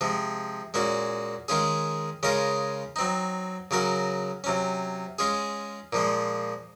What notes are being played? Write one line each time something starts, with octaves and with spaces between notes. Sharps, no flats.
C3 F3 G#3
A#2 G#3 C#4 F#4
D#3 G#3 C#4 F4 G#4
C#3 G#3 C#4 F4 A#4
F#3 C4 D#4
C#3 F#3 C#4 F#4 A#4
C3 F#3 C#4
G#3 C#4 F4 G#4
A#2 F3 G#3